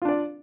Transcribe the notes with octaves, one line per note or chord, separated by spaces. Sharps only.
D4 F4 D5